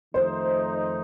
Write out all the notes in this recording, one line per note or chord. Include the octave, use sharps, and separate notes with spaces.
F2 D#3 A3 D#4 C5